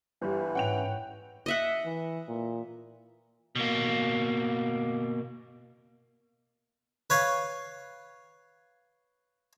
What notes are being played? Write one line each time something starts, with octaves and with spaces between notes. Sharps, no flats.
G1 E3 G3
G#2 C#4 F#5 G5 F7
D#5 E5 F#5
E3
A#2
B2 A#3
B4 C#5 F5